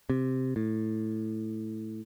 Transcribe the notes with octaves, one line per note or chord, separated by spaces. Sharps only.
C3
A2